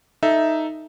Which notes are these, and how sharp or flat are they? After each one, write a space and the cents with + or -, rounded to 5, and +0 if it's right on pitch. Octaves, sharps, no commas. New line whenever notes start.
D#4 +0 A4 -10 E5 +0